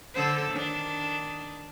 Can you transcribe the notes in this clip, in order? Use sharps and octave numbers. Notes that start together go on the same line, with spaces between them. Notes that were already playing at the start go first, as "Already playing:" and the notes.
D3 A4 C5
D#3 D4